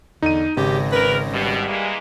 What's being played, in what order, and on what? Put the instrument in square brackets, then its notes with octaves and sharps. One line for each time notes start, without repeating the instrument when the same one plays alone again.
[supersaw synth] E2 [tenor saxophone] D3 [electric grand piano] D#4 D#7
[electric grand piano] G#1 [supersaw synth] C#3 A#6 [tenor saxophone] G4
[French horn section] A#4 [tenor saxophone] B4
[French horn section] B2 [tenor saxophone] G3
[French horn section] E3 G#3 A#3